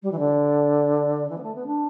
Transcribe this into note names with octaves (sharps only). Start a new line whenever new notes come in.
G3
E3
D3
E3
B3
A3
B3
D4